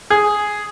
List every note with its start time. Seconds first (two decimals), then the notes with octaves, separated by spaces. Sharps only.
0.10 G#4